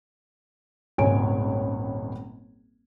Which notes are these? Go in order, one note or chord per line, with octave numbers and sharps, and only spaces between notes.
D#1 G#1 C#2 C#5 G#5 D7